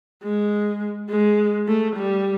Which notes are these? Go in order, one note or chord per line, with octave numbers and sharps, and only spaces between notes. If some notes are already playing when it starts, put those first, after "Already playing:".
G#3
G#3
A3
G3